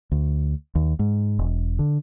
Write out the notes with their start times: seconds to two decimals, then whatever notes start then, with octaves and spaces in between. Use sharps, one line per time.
0.12 D2
0.75 D#2
0.99 G#2
1.39 E1
1.79 D3